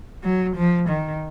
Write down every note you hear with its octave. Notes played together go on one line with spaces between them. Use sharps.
F#3
F3
D#3